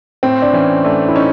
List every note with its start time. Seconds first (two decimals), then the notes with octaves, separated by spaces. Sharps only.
0.23 A2 C4
0.42 D4
0.53 E3 C#4
0.85 A3 D4
1.08 E4
1.15 C#4 D#4